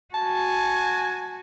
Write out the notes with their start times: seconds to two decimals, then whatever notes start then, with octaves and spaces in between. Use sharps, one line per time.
0.14 F#4 G#5 A5